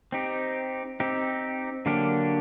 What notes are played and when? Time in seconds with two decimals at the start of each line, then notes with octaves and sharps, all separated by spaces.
0.12 C4 D#4 G4
1.00 C4 D#4 G4
1.86 D3 F#3 A#3 D4 G4